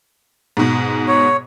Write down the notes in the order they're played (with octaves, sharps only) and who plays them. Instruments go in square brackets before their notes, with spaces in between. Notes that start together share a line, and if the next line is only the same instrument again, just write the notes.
[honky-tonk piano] G#2 B2
[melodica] C#5